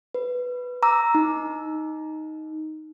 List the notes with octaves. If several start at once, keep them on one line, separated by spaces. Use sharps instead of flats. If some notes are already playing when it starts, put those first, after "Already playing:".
B4
A#5 D6 E6
D#4